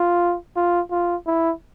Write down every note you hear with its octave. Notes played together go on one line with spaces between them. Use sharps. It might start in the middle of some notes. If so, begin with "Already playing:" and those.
Already playing: F4
F4
F4
E4